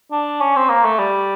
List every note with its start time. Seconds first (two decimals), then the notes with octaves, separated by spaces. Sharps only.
0.12 D4
0.41 C#4
0.56 C4
0.70 A#3
0.85 A3
0.99 G3